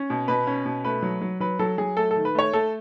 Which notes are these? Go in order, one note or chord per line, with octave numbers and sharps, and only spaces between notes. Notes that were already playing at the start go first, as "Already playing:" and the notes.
Already playing: C#4
B2
B2 B4
C#4
B2
A3 B4
F#3
F#3
F#3 B4
F#3 A4
F#3 G#4
A3 A4
A4
D#3
B4
A3 C#5
A3 A4